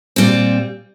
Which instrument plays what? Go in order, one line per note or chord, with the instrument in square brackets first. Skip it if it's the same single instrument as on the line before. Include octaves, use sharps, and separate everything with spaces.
[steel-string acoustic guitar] A#2 G3 C4